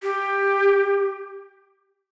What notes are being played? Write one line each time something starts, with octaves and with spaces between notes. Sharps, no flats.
G4